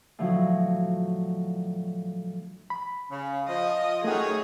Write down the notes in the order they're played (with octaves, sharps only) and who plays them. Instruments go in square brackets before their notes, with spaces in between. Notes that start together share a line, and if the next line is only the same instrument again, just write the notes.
[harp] A2 D3 F3 F#3
[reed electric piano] B5
[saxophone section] C#3
[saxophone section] F3 [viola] D#5
[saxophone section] F#2 D#3 [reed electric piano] A3 F#5 [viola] G#4 C#5